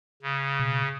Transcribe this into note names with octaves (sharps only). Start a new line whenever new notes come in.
C#3
B2